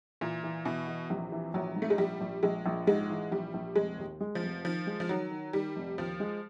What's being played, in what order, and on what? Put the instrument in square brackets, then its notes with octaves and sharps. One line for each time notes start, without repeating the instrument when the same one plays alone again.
[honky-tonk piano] A#2 [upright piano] E3
[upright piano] E3
[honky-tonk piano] B2 [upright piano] E3
[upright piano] E3
[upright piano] A#1 [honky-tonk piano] C3
[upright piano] E3
[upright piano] A#1 [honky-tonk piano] F#3
[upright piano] G#2
[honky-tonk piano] A3
G#3
[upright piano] A#1 [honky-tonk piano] G3
[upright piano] A#1
[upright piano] A#1 [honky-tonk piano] G#3
[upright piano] A#1
[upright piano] G#2 [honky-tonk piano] G#3
[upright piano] E3
[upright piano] A#1 [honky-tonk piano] G3
[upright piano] A#1
[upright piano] F1 [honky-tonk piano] G#3
[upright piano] D#2
G#3
[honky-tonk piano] F3
[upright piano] F1
[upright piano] D#3 [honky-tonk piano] F3
[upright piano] G#3
[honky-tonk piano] F3
[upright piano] D#3 [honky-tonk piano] F#3
[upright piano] D#3
[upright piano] D#3 [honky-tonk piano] G3
[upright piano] F1
[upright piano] D#2 [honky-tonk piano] F3
[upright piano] G#3